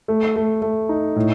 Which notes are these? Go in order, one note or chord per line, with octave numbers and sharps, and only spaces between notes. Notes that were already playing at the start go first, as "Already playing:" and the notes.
A3
A3
A3
D#4
A2